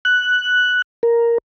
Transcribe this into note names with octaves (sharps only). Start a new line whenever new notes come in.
F#6
A#4